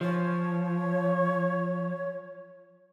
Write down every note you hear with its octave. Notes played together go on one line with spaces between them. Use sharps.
F3 C#5